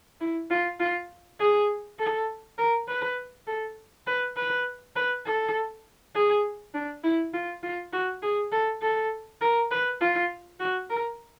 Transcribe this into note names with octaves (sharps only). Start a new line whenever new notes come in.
E4
F4
F4
G#4
A4
A#4
B4
A4
B4
B4
B4
A4
G#4
D4
E4
F4
F4
F#4
G#4
A4
A4
A#4
B4
F4
F#4
A#4